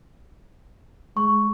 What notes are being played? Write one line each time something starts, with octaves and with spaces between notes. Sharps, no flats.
G#3 C#6